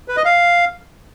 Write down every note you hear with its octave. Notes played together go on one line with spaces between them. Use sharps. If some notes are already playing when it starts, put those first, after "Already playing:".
B4
D#5
F5